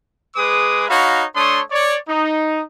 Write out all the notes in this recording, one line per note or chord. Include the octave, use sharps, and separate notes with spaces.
G#3 G#4 B4 D6 D#6
D#4 F#4 C#5 F5 B5
A3 D4 C#5 C6 D#6
C#5 D5
D#4